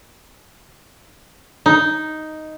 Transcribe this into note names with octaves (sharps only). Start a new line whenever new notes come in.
D#4